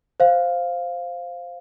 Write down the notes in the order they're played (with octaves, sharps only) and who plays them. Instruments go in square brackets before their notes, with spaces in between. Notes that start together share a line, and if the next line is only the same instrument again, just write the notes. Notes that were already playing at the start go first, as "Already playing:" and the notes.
[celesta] C5 F5